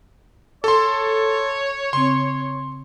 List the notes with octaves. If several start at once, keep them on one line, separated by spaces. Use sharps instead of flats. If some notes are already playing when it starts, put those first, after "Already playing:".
A4 C#5 C6
C#3 C4 C6